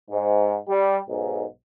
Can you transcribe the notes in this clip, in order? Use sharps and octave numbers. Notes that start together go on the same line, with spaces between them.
G#2
G3
B1 G#2